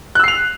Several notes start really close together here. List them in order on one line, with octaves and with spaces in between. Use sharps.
F#6 E6 C7 F7